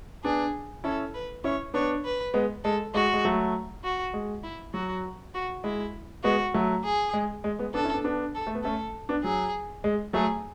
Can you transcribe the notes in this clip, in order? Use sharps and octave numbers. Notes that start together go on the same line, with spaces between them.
B3 D4 G#4
C#4 E4 A4
B4
C#4 E4 C#5
B3 D4 C#5
B4
G#3 B3
G#3 A4
G#3 F#4
G#3
F#3 A3
F#4
G#3
E4
F#3 F#4
F#4
G#3 E4
G#3 B3 F#4
F#3 A3
G#4
G#3
G#3
G#3 B3
B3 D4 A4
C#4 E4
B3 D4
B3 D4
A4
A3
B3
A3 C#4 A4
B3 D4
F#3 G#4
G#3
F#3 A3 G#4